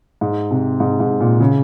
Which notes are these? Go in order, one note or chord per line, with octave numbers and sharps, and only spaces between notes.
G#2
C3
G#2
G#2
A#2
C#3